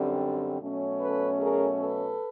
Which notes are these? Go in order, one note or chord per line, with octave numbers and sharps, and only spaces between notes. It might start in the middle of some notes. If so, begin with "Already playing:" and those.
Already playing: F#2 D3 G3 C4
B2 F#3 A3 C#4
A4 B4
G#4 A#4
A4 B4